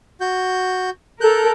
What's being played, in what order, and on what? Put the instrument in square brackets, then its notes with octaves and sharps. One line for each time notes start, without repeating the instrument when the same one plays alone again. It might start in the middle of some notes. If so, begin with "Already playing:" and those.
[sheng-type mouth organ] F#4 G6
[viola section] A4 A#4 [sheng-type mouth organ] F#6 G6